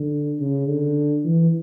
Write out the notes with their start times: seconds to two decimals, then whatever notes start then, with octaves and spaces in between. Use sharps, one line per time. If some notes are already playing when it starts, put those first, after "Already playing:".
Already playing: D3
0.40 C#3
0.68 D3
1.25 E3